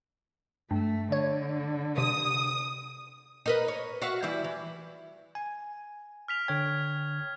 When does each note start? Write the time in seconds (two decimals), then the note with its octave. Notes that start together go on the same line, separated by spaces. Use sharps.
0.71 G2 A3
1.12 D3 C#5
1.98 C3 D#6
3.46 D#4 A#4 B4
3.68 C#5
4.02 F#4 E5 F5
4.23 E3 G3 E4
4.44 E3
5.35 G#5
6.28 F6 B6 F7
6.48 D3 C#5 G5 G#6